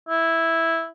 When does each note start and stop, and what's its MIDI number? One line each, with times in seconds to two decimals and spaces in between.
0.08 0.86 64